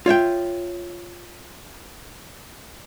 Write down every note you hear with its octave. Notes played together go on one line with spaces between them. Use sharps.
F4 C#5 E5 G5